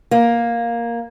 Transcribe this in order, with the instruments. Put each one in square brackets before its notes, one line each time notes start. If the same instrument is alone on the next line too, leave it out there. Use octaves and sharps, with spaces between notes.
[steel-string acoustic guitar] A#3